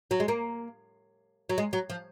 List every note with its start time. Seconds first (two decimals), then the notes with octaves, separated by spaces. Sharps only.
0.11 F#3
0.20 G#3
0.28 A#3
1.49 F#3
1.58 G#3
1.73 F#3
1.90 F3